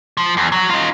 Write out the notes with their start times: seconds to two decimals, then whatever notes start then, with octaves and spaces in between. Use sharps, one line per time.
0.17 F3
0.37 E2
0.52 F#3
0.70 D#4 F4